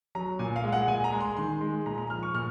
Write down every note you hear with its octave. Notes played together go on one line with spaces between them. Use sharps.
F#3 A#5
A#2 G#5
F5
G#3
F#5
A#2 G#5
A#5
G#3
C6
D#3 C6
G#3
A#2 A#5
A#5
F3 F6
C#6
A#2 F6